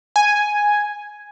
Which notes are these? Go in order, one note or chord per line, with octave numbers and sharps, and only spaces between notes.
G#5